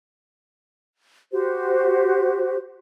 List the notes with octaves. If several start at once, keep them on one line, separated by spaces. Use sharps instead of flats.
F#4 G4 C5